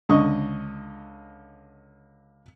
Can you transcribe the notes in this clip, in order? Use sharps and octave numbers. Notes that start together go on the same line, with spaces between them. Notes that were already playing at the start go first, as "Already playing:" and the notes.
C#2 D3 D#5 C#6